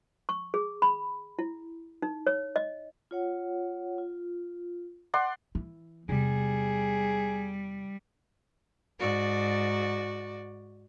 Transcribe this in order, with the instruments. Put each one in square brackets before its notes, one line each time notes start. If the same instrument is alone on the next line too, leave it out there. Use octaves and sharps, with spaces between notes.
[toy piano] C#6
G#4
B5
E4
D#4
C#5
D#5
[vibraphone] F4 C#5 F#5
F4
[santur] D5 F#5 C6
[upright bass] E3
[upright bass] E2 C3 [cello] G3 [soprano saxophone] G#4
[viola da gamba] G#2 F#4 D5